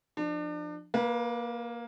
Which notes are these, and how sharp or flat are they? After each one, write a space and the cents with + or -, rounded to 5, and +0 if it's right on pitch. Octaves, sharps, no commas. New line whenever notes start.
F3 +0 D4 +35
A#3 +10 B4 -25